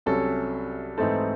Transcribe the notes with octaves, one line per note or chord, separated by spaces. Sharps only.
C2 C3 F#3 C#4 A4
G#2 E3 A3 C4 D#4 A4